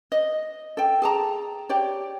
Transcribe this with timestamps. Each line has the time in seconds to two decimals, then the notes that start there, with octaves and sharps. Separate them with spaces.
0.12 D#5
0.77 A4 G5
1.02 G#4 A5 A#5
1.69 G4 C#5 D5